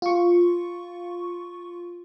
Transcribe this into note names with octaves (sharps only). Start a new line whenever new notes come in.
F4 C#6